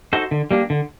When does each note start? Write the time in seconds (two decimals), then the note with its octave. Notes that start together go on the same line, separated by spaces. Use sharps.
0.13 D#4 F#4 A4 C5
0.31 D3
0.51 G3 A#3 D4
0.70 D3